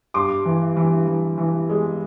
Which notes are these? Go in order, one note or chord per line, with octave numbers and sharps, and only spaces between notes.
G2 C6 D6
E3
E3
E3
E3
G#3